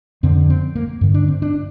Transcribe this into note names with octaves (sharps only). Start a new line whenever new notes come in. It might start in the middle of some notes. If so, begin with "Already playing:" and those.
F2 D3 C4
C4
A#3
G2 D3
D4
C4
D4